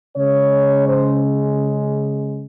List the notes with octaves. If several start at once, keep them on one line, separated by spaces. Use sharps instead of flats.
C#3 G#3 C#5
C5